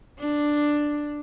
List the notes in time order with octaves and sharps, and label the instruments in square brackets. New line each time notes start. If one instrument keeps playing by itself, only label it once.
[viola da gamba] D4